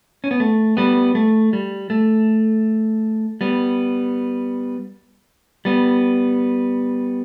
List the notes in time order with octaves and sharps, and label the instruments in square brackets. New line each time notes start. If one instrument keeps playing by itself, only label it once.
[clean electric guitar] C#4
B3
A3
G3 B3
A3
G3
A3
G3 B3
G3 B3